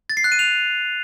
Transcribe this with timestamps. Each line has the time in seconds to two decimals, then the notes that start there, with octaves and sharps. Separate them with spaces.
0.10 A6
0.17 C7
0.24 F#6
0.32 D#7
0.39 F7